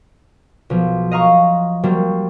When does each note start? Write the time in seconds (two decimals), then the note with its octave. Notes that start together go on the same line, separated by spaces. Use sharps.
0.70 B1 F3
1.11 D#5 F5 A#5 C#6
1.83 F#3 G3 A#3 C4